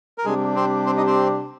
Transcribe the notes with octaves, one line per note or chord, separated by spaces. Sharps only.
A#4
C3 G3 G#3 D4 G4 G#4
C4 C5
C4 C5
D#4 D#5
C4 C5